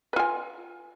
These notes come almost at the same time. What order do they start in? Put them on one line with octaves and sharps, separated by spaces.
B4 F4 G#5